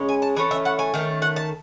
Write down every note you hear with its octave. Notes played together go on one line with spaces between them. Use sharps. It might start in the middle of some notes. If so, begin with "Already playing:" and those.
Already playing: C#3 G#3 C#4
G#5
A5
E3 A3 C#4 G#5
E5
F#5
G#5
D#3 A3 C#4
F#5
A5